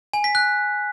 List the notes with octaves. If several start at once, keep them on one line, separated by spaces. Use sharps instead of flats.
G#5
B6
F#6